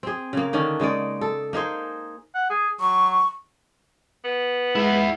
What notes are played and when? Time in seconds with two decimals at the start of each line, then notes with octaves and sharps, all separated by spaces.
0.03 C4 G#4
0.33 C#3 A#3
0.53 D3 D#3 C#4 D4
0.80 C#3 G#3 D#4 D5
1.21 A4
1.53 A#3 D#4 G#4 C5
2.35 F#5
2.50 G#4
2.80 F#3 C#6
4.24 B3
4.75 G#3 E4 F#5